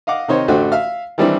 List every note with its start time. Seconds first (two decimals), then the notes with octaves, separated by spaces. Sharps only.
0.07 D#5 F5 F#5 D6
0.28 C3 D#3 D#4 C5 C#5
0.48 A1 D3 A3 F#4 C5 G5
0.72 E5 F5 F6
1.18 D#3 E3 G3 C4 D4 E4